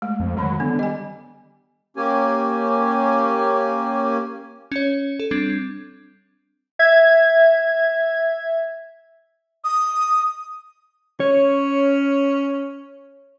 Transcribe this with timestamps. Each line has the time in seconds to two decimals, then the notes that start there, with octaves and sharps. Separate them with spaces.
0.02 G#3 A3
0.20 F2
0.37 D3 D#3 F#3 G#3
0.60 D3 B3
0.79 G3 D#5 G#5
1.97 A#3 C#4 G4 G#5
4.72 C#4 C#5
5.20 A4
5.31 G3 C4 D4 G#6
6.79 E5 G#6
9.64 D#6
11.20 C#4 C#5